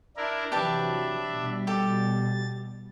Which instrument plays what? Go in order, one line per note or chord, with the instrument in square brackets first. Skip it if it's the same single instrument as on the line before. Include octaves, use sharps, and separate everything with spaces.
[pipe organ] D4 E4 A#4
[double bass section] C3 E3 F#3 [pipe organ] D4 E5 [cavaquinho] G4 B4 A5
[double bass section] B2 G3
[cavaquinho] G4 A4 [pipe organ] A6